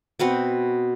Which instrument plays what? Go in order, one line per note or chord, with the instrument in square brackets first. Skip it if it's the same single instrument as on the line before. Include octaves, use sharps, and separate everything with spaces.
[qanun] B2 B3 C4 F#4